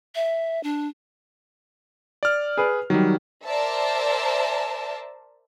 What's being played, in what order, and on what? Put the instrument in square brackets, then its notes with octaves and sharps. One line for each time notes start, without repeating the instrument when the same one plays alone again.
[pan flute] E5
D4
[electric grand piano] D5 F6
[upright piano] G#4 B4
[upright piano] D#3 [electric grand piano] F#3 G3
[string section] A#4 C5 D5 E5 A5